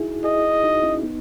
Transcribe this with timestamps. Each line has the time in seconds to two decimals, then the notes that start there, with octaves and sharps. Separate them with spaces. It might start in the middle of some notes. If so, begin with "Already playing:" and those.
Already playing: D#4 E4 F#4 G#4
0.24 E4 G#4 D#5
0.64 D#4 F#4
0.83 C#4 E4
1.03 B3 D#4